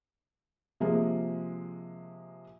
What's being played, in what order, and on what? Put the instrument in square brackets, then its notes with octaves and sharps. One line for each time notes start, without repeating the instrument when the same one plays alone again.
[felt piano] C3 F3 G#3 A#3